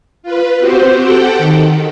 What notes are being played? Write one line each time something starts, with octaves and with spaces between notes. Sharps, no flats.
F4 B4
C4 F#4 G4 C5
G4 A4 F#5 G5
D#3